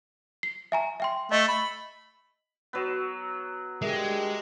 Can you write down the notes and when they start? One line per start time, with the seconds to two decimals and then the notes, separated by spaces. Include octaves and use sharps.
0.43 C7
0.72 E5 G#5 A#5
1.00 E5 G5 C6
1.32 A3 D#5
1.48 B5
2.73 F#3 B3
3.82 G#3 D4 G4 G#4 A#4 E5